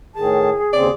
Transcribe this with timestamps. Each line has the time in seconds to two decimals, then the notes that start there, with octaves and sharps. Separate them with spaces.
0.16 A2 D#3 G#4 A5
0.73 D#2 C#3 C4 D5